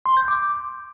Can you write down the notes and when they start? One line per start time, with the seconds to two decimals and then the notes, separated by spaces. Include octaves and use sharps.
0.06 C6
0.17 G6
0.28 D6